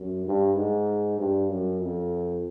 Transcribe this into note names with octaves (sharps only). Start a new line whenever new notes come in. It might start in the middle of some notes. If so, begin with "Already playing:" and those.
Already playing: F#2
G2
G#2
G2
F#2
F2